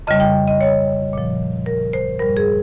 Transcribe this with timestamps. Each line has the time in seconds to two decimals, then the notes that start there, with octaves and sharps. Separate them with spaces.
0.07 F2 C#3 G3 D#5
0.20 G5
0.48 D#5
0.61 C#5
1.13 A#2 F3
1.66 A#4
1.93 C5
2.19 G2 G3 A#4
2.37 G#4